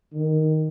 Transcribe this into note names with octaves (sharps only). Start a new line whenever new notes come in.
D#3